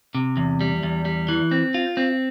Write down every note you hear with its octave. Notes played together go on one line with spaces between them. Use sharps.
C3
E2
G3
E2
G3
E3
C4
F4
C4